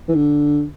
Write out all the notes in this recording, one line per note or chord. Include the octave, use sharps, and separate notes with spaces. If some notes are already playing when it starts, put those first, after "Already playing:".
E3
D3